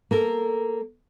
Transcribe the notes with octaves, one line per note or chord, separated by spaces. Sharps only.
A#3 A4 A#4